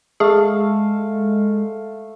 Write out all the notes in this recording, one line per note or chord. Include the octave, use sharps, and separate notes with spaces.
G#3 A3 G#4 F5